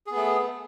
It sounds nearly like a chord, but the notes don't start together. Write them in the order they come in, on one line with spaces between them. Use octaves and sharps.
G#4 B3 A3